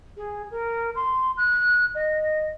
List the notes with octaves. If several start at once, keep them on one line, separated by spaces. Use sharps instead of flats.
G#4
A#4
C6
F#6
D#5